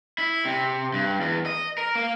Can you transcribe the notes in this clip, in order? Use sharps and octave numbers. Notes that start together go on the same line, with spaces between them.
E4
C3
G2
E2
D#5
A#4
A#3